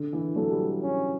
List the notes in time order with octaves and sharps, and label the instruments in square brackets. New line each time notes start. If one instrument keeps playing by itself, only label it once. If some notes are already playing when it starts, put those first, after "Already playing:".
Already playing: [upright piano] D3
E3
[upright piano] F#3 [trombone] A4
[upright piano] G3
[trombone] C#4